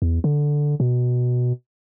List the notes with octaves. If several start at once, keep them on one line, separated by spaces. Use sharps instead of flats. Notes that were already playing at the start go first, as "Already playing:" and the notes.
E2
D3
B2